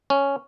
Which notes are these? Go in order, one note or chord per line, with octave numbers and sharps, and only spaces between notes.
C#4